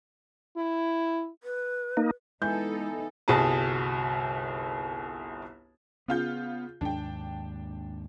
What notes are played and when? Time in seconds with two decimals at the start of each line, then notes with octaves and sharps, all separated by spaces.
0.57 E4
1.43 B4
1.97 A#3 D#4
2.42 E3 G#3 B3 D#4 A4 G6
3.28 G1 C2 F#4 G#4 A5
6.08 C#3 B3 F4 G6
6.81 D#2 G#2 D4 G5